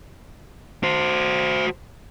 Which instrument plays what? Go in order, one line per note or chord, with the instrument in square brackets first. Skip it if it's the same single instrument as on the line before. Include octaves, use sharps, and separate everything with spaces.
[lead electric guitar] F#4 C5